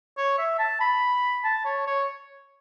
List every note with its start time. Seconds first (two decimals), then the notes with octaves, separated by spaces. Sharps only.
0.18 C#5
0.39 E5
0.59 A5
0.81 B5
1.44 A5
1.65 C#5
1.87 C#5